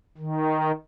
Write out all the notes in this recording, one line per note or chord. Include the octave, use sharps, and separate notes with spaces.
D#3